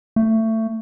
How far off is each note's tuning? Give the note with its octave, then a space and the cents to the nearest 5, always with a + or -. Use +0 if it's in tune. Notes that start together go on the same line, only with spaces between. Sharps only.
A3 +20